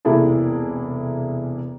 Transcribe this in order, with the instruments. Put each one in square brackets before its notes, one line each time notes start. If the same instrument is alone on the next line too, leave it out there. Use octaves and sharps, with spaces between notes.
[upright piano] E1 C2 A#3 E4 G#4 A4